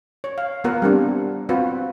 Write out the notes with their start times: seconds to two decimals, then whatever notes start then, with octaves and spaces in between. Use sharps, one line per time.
0.24 C#5
0.38 F5
0.64 A#3 B3 F4 A#4 F#5
0.82 G3 C4 D4
1.49 C4 F4 F#4 B4